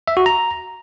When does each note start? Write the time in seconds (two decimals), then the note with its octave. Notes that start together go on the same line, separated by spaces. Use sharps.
0.08 E5
0.17 F#4
0.26 A#5